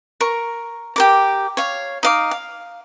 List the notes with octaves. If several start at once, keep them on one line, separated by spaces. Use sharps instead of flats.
A#4 C#6
G4 A#4 D6
C#5 F5
D#4 F5 D6
F5